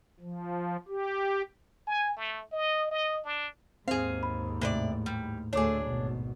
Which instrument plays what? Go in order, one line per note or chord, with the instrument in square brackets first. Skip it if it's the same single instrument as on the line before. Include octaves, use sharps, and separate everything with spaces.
[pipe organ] F3
G4
[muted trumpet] G#5
A3
D#5
D#5
D4
[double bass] D#2 G#2 [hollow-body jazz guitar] C4 [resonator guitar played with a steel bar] G#4 F5
[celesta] B5
[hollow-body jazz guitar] A2 [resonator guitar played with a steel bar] C3 B4 D5
[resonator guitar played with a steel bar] G3
[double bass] D2 A3 [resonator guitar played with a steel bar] D4 G#4 [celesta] C#5 D6
[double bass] G#1 B2